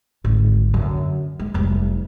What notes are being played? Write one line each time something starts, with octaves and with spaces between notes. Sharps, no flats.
G#1 D2
F#2 D3
G#3
F1 G3